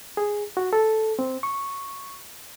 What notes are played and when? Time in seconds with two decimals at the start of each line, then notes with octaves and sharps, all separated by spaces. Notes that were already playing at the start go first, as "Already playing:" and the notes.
0.17 G#4
0.57 F#4
0.73 A4
1.19 C4
1.43 C#6